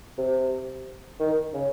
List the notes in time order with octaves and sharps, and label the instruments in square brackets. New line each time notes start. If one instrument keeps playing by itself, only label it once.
[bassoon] C3
D#3
C#3